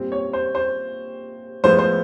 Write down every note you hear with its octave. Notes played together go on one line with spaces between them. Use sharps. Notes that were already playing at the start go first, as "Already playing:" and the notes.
Already playing: A#2 G3 C4
C#5
C5
C5
A2 F3 G#3 B3 C5
C5